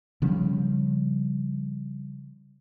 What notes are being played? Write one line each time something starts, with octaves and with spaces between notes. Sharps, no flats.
C#3 F3 G3 C#4